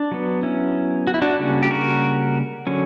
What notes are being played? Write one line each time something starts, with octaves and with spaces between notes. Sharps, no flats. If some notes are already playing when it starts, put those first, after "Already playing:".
Already playing: D4
F#3 B3
C#4 E4
F#4
E4
D4 F#4
C#3 G3 A#3 C#4
G4
F#4 A#4
D3 F#3 C#4